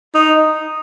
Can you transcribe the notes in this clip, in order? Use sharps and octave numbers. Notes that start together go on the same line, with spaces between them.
D#4